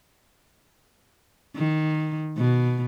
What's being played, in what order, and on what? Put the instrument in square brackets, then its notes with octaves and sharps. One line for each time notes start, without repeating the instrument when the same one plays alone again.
[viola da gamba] D#3
B2